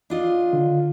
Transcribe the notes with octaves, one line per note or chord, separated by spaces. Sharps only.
D4 F4 D#5
D3